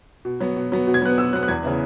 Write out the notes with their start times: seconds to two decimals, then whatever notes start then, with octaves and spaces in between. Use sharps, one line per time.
0.25 B2
0.41 F#3 B3
0.56 B2
0.72 F#3 B3
0.87 B2
0.94 G#6
1.02 F#3 B3 F#6
1.18 B2 E6
1.33 F#3 B3 F#6
1.43 F#6
1.48 E2 G#6
1.63 C#3 E3 B3